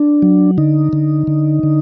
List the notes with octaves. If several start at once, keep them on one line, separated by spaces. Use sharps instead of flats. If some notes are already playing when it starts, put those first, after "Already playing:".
Already playing: D4
F#3
D3 D#4
D3
D3
D3